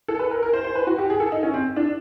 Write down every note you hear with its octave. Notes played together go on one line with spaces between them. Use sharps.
A4
B4
A#4
A#4
C5
C5
B4
F#4
G4
G#4
A4
D#4
C#4
C4
D4